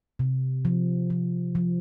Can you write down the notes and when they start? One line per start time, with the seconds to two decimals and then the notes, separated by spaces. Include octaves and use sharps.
0.19 C3
0.65 F3
1.10 F3
1.55 F3